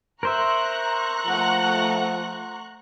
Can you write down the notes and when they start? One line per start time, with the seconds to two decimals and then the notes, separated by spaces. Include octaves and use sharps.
0.23 A#4 C5 E5 A#5 C#6 F#6
1.26 F3 A3 F#5